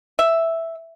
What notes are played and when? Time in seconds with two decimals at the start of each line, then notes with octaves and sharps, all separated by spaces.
0.19 E5